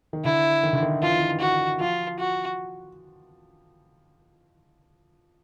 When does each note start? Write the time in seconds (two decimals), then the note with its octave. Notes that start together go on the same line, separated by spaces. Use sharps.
0.13 D#3
0.24 D3 E4
0.63 D#3
0.73 D3
0.82 D#3
1.02 E3 F4
1.11 D#3
1.20 E3
1.40 F#4
1.80 F3 F4
2.19 F#4